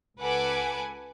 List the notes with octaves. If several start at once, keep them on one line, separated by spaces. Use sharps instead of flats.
C#2 A4 B4 F#5 G#5 D6